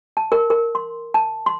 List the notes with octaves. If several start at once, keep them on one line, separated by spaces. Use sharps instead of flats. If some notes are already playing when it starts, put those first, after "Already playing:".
A5
A#4
A#4
C6
A5
C6